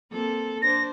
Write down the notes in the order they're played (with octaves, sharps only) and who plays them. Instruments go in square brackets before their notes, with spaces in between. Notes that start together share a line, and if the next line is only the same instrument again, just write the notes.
[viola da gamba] A#3 C4 A4
[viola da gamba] D4 C5 [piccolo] A#6